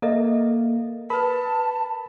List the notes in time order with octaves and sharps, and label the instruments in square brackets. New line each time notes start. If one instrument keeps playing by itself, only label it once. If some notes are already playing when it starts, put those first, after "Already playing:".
[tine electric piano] A#3 [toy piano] A4 D#5 E5
[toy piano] A#4 B4 [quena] A5 [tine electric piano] B5